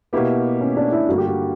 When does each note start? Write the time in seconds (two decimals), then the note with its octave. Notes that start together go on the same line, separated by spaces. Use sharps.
0.13 B2 A#3 B3 E4 G4
0.61 C#4
0.77 D4
0.92 E4
1.08 G2 D3 A#3 F#4
1.18 G4
1.27 F#4